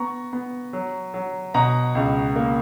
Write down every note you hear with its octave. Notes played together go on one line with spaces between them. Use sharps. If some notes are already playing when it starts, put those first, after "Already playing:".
Already playing: B3 A#5 C#6
B3
F#3
F#3
B2 F#5 A#5
C#2
A#3